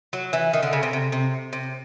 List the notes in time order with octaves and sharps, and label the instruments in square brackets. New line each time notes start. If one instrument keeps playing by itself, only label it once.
[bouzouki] F#3
E3
D#3
D3
C#3
C3
C3
C3
C3